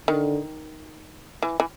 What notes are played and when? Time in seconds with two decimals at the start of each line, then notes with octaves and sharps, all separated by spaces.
0.08 D3 D#3
1.42 E3
1.60 E3